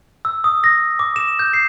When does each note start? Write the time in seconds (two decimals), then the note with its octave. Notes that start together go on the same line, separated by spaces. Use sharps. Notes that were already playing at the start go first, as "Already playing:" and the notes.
0.25 E6
0.44 D#6
0.64 A#6
0.99 D6
1.16 E7
1.39 G6
1.53 C7